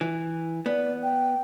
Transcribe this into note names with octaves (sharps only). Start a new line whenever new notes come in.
E3
B3 D5
G5